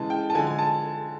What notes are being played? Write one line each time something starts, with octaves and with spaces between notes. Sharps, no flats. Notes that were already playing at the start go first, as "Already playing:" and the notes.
Already playing: C#3 E3 G#3 A5
G5
A5
D3 F3 G#3 G#5
G#5
A5